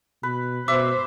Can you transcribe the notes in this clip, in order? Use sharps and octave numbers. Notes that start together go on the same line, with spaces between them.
B2 B4
B2 C5 E5 D6